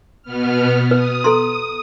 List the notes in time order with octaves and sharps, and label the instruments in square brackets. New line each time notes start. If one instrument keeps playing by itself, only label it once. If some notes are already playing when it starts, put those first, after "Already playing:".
[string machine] B2 B3 F6
[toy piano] B4 [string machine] D#6
[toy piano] A4 A#5 C6